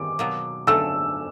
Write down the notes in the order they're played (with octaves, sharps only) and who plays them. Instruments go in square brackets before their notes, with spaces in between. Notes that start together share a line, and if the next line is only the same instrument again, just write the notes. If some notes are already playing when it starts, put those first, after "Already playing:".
Already playing: [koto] D#3 G3 C4 [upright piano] D6
[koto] B2 F#3 A#3
[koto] D3 F#3 A3 [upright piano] E6